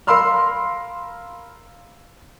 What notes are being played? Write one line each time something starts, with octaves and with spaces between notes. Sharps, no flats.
A#4 F5 B5 C6 E6 F6